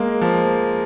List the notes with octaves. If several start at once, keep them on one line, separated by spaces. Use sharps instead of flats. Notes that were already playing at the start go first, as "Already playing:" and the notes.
Already playing: G#3 A#3
F3